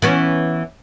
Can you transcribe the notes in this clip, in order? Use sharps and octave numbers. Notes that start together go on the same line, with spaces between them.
E3 B3 C#4